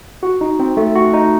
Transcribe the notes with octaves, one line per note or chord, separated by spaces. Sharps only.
F#4
D#4
C4
A3
F#4
D#4